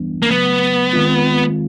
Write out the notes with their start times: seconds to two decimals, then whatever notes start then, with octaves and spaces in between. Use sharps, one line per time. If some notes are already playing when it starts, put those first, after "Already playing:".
Already playing: E3 G3 B3 D4
0.23 A#3
0.31 C#3 F#3 A3 B3
0.93 D#3 G#3 C4 F4